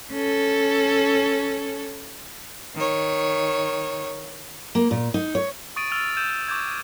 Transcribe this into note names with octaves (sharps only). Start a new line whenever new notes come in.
C#4 A4
D#3 C#5
A#3
A#2
D#4
C#5
C#6 D#6 A6 D7 D#7
E6 F6 A6 F7
E6 G6 D#7 E7
C#6 D6 G6 G#6